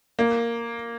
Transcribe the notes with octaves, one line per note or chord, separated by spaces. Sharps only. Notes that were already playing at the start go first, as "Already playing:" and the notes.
A#3